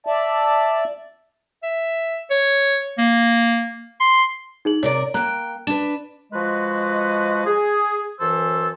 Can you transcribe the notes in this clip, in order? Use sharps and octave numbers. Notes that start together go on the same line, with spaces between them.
D5 E5 A5
E5
C#5
A#3
C6
D#4 G#4 F#7
C3 A#4 C#5 D5
A#3 G5 A#5 F#6
D4 B4 E7
F3 G#3 F#4 B4 D#5
G#4
F#2 E3 A4 C5 E6